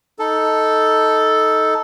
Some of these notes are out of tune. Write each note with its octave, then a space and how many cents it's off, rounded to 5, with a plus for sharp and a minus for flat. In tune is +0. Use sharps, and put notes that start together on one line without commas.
D#4 +10 A4 +0